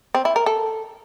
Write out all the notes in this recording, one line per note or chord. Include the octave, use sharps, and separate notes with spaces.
C4
E4
A#4
A4